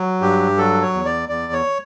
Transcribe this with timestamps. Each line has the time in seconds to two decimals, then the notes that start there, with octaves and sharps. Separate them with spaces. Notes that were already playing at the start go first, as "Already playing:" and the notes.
Already playing: F#3
0.21 G2 G4
0.58 F#3 A4
0.82 C#5
0.93 E2
1.05 D5
1.29 E2 D5
1.53 C#5